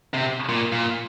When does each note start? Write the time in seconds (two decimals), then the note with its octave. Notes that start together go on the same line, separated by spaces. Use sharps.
0.14 C3
0.49 A#2
0.72 A#2